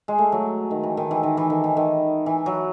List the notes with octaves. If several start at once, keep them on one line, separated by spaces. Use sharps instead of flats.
G#3
A3
F#3
D#3
E3
D#3
E3
D#3
E3
D#3
E3
D#3
E3
F#3